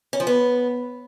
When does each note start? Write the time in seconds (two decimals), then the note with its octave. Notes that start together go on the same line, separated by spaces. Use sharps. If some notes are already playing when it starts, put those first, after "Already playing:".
0.13 C#4
0.20 F3
0.27 B3